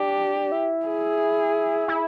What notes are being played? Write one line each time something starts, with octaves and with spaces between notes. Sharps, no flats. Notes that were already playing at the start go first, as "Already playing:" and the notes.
Already playing: D4 G4
E4
G#4
E4